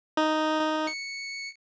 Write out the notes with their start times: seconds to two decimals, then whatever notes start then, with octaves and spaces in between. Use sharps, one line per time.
0.17 D#4
0.59 D#4
0.87 C#7